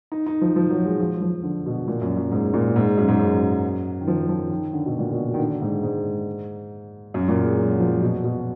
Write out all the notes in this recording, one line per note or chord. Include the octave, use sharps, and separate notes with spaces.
D#4
D#4
F3
F3
F#3
G#3
F3
F3
D3
B2
A#2
F#2
F#2
G#2
A#2
G#2
F#2
G#2
F#2
D#3
F3
F3
D#3
D3
B2
A#2
B2
D#3
D3
G#2
G#2
F#2
A#2
G#3
F#3
F3
B2
B2